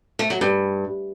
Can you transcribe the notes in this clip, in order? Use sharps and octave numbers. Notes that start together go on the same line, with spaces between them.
A3
F#3
G2